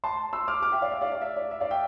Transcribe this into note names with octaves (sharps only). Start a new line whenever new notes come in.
A5 C6
C6 E6
D6 F6
D6 F6
E5 G5
D5 F5
E5
D5 F5
D5 F5
E5
D5
E5
D5 F5
E5 G5